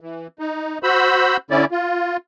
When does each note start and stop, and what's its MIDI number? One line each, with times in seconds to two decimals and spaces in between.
0.01 0.27 52
0.39 0.78 63
0.83 1.37 66
0.83 1.37 72
0.83 1.37 83
0.83 1.37 88
1.51 1.65 50
1.51 1.65 61
1.51 1.65 64
1.51 1.65 74
1.71 2.17 65